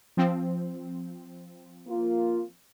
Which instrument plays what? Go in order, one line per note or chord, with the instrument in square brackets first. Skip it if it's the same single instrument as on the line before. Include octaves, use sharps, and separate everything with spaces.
[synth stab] F3 C4
[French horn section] A#3 F4